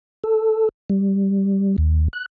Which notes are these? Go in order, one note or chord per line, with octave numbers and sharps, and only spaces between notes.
A4
G3
D#2
F#6